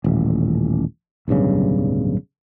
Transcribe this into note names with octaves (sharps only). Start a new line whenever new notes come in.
D#1 A1
D1 B1 G2 C#3